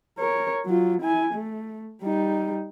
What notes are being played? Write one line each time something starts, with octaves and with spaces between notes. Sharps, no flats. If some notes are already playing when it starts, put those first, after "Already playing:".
A#4 C#5
F#3 F4
E4 G#5
A3
G3 D#4